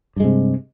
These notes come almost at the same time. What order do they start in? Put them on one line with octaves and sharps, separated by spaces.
G2 G#3 C3